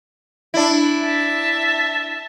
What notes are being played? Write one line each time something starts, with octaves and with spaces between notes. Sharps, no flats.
D4 E4
E5 A5